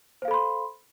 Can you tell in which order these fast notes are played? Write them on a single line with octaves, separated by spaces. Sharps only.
C5 F5 A4 B5 C6